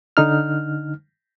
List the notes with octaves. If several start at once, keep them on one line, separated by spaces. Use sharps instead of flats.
D3 D#4 F6